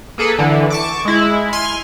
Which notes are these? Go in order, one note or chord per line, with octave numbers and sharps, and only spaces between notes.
A#3 G#4 A4 B4
D3 E3
A5 C#6 D6
G#3 E4
G#5 C6 F6